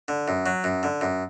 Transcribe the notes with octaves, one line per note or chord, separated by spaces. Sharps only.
D3
F#2
F#3
F#2
D3
F#2